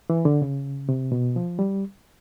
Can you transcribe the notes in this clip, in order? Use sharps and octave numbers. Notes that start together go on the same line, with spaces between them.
E3
D3
C#3
C3
B2
F3
G3